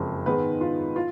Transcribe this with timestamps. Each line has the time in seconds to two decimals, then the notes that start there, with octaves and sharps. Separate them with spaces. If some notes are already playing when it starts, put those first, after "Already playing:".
Already playing: F#1 F2 F3 G#3
0.26 G#2 D#3 G#3 B3 B4
0.61 F4
0.96 F4